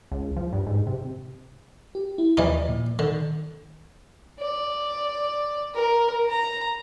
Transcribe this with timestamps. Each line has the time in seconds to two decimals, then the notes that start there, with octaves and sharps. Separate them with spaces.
0.12 C#2
0.36 F3
0.53 G2
0.67 G#2
0.87 C3
1.95 G4
2.18 E4
2.37 D#2 E3 F3 G3 D#4 D5
2.69 A#2
2.99 D3 D#3
4.40 D5
5.75 A#4
6.29 A#5